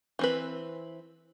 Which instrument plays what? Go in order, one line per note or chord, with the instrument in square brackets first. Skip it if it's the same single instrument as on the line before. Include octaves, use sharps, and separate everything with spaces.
[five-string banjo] E3 C4 B4